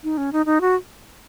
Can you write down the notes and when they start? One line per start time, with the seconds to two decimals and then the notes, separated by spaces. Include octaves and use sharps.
0.03 D#4
0.17 C#4
0.32 D#4
0.46 D#4
0.61 F#4